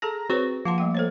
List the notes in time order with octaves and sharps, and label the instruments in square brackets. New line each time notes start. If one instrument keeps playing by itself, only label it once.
[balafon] G#4 A4 A5 [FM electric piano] A#5 A#6
[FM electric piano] C4 [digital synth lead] F#4 [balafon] G#4 B4 C#5
[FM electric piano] F3 [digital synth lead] A#3 [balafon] F#5 A5 C6
[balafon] G3 A3 G5
A4 C5 C#5